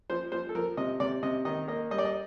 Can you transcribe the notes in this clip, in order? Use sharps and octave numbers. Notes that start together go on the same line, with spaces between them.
F3 C5
F3 C5
A4
F3 A#4
C3 D#5
C3 D5
C3 D#5
D#3 D#5
A#3 D#5
G3 D#5
D5
D#5